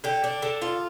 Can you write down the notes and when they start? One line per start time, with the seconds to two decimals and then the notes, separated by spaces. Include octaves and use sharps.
0.04 D3 G4
0.24 D4
0.42 D3
0.62 F4